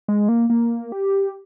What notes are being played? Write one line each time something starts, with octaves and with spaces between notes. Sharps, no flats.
G#3
A#3
A#3
G4